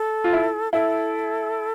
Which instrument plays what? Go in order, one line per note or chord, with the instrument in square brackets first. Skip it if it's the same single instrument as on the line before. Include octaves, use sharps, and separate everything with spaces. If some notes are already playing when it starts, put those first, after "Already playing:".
Already playing: [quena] A4
[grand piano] F4
E4
[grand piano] E4 [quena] A4